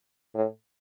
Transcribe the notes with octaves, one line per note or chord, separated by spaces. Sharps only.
A2